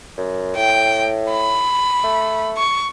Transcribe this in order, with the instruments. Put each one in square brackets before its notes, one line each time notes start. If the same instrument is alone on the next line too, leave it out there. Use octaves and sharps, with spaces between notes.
[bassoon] F#2
[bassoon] A2 [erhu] G5
[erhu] B5
[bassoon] A3
[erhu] C#6